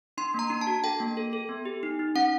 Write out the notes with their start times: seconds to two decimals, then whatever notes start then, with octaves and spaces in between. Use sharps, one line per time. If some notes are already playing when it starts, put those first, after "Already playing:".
0.18 D4 C6
0.34 A#3 A#5
0.50 D4
0.61 A5
0.67 F#4
0.84 A4 G5
1.00 A#3
1.17 A4
1.33 A4
1.49 B3
1.65 G4
1.83 D#4
1.99 D#4
2.15 C#4 F#5